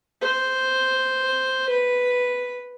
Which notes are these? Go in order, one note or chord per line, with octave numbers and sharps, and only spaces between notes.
C5
B4